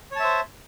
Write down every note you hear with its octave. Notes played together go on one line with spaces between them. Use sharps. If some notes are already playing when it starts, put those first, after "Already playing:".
C5 C#5 E5 A5